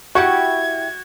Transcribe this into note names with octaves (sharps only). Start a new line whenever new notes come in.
E4 F#4 G4 C#6 G#6